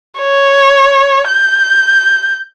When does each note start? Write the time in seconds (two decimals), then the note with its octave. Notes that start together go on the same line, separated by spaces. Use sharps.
0.19 C#5
1.29 G6